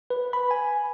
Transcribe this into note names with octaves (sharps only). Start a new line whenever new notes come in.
B4
B5
G#5